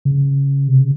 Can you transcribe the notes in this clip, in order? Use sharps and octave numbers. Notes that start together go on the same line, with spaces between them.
C#3
C3
C#3